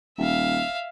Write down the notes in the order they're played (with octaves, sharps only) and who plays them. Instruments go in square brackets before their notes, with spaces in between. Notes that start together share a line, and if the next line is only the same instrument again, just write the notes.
[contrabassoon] D#1 [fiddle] E5 F5